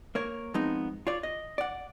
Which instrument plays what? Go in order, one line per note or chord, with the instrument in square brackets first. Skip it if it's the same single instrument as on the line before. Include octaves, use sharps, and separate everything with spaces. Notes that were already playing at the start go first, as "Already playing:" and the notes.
[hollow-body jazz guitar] A#3 A#4 C#5
F3 G#3 B3 C4 D#4
F4 C#5 D5
D#5
D5 F#5